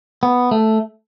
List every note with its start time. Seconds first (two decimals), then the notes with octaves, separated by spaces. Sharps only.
0.23 B3
0.51 A3